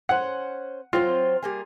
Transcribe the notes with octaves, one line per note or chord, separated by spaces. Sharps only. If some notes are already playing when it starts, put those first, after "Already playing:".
C#4 C5 F#5
F#3 C4 F4 C5
G3 A#3 G#4